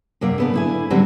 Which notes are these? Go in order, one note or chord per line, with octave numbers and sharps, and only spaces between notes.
F#2 C3 A#3 D5
C#3 B3 D4
D3 E4 G#5
D3 F#3 G3 B3 C4 D4